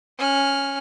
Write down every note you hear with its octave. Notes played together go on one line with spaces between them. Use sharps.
C#4 F6